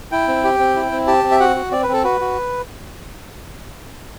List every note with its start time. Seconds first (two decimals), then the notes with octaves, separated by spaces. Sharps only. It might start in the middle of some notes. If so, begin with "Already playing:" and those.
0.12 E4 G5
0.28 C4
0.44 G4
0.59 C4
0.76 E4
0.92 C4
1.07 G4 A5
1.24 C4
1.31 E5
1.40 F#4 F#5
1.56 F#4
1.72 C4 D5
1.83 B4
1.88 C4 A4
2.04 F#4 B4
2.20 F#4